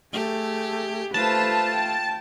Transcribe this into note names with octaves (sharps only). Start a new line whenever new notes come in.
A3 G4 G#4
A3 F4 B4 C5 A5
G5